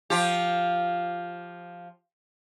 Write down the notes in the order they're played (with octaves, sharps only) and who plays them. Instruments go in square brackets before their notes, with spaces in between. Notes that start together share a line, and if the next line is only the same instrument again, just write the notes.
[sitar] F3 F4 G4